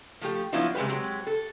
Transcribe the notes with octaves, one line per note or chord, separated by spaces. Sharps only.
F3 A3 G4
F3 F#3 B3 D4 E4 F4
C3 G3 G#3 G4 B4
F#3 G#3 C4 G4
A4